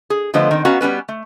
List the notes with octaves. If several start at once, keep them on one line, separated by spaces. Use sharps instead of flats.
G#4
D3 F3 A3 B3 C5 D#5
D#3 C4
B3 C#4 F#4 F5 F#5 A#5
G3 B3 C#4 B4
A3